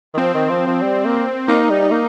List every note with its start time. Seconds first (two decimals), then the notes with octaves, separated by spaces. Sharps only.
0.14 D#3
0.18 F3 C4
0.34 D#3
0.50 F3
0.67 F3
0.82 G3
1.05 A#3
1.48 A#3 D#4
1.70 G3
1.91 A#3